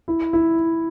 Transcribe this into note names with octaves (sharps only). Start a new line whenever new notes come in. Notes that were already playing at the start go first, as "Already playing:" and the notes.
E4
E4